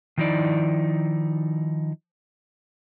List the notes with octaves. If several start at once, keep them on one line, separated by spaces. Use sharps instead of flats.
D#3 F3 D#4 E4 D5